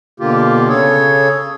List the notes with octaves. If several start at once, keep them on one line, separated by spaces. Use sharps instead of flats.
B2 D3 A#3 F4 G4
C#3 G#4 A4 C#5